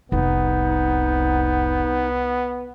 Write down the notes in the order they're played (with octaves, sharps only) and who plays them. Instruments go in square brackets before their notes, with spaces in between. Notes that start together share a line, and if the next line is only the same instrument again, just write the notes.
[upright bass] F1 [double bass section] C2 [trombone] B3 [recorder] D#4